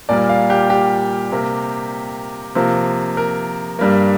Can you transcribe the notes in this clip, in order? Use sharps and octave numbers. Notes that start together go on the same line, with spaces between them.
A#2 G3 A#3 D5
F5
G4
G4
C3 A#3
C3 F3 A#3
A#4
G2 G3 A#3